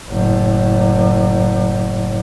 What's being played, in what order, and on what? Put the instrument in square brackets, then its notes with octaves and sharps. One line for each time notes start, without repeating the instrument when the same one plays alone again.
[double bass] F#1 A2